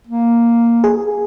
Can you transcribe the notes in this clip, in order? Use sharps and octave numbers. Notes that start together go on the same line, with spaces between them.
A#3
G#4